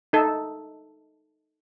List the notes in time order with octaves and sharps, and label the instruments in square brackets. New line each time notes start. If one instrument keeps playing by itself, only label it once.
[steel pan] D#4 A4